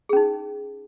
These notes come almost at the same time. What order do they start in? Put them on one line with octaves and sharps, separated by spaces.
G#4 C#4 D#4